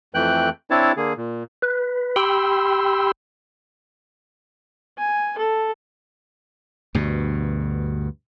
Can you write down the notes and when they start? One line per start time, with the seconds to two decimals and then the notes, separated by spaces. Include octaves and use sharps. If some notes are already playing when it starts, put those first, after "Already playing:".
0.14 F2 E3 A3 G5 F#6
0.70 C4 D4 E4 C#5 A5
0.97 D3 A#3 G#4
1.17 A#2
1.62 B4
2.16 G4 G5 B5 C6 E6
4.98 G#5
5.38 A4
6.95 D2 G2 B2